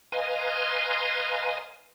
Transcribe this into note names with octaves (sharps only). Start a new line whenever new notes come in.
B4 D#5 F5 G#5 A#5 C6